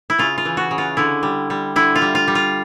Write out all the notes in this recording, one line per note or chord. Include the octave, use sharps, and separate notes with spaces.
E4
C#3 F4
F4
E3
F#4
C#3
F4
D3 E4
G3
G3
D3 E4
F4
G3
F4
G3
F4